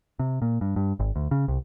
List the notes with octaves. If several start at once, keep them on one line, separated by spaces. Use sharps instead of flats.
C3
A#2
G2
G2
G#1
D2
C#3
C2